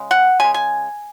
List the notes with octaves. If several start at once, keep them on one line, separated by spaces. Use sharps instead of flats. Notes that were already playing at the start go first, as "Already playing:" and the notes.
Already playing: C#3 G#3
F#5
C#3 G#3 G#5
G#5